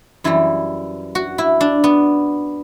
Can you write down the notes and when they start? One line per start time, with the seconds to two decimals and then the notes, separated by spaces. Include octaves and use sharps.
0.24 F#2 E3 G3 E4
1.15 F#4
1.38 E4
1.61 D4
1.84 B3